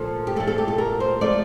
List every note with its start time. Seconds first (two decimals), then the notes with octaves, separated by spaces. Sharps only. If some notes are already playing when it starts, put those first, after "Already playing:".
Already playing: A#2 F3 A3 A4
0.27 G4
0.36 A#2 A4
0.40 A3
0.47 A4
0.58 G4
0.68 A4
0.78 A#4
1.00 C5
1.21 F3 A3 D5